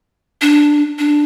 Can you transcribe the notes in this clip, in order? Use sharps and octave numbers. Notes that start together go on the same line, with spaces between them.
D4
D4